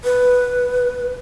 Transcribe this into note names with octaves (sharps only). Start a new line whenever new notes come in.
B4